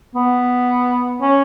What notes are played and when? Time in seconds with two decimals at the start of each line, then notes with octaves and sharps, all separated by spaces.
0.15 B3
1.22 C#4